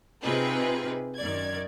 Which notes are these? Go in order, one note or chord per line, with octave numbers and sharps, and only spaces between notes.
C3 C4 D#4 F4 G#4 B4
F#2 D#3 D5 G#6